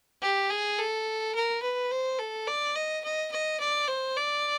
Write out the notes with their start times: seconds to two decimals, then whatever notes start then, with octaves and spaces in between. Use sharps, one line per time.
0.22 G4
0.50 G#4
0.79 A4
1.35 A#4
1.63 B4
1.91 C5
2.19 A4
2.48 D5
2.76 D#5
3.04 D#5
3.32 D#5
3.60 D5
3.88 C5
4.17 D5